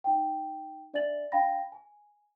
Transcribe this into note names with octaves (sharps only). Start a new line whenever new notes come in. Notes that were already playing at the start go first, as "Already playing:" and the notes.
D#4 G5
D4 D5 E5 G#5 A6 F#7
D4 F5 G5 B5 A#6
G#5